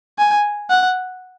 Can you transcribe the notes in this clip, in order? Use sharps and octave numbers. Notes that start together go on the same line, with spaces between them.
G#5
F#5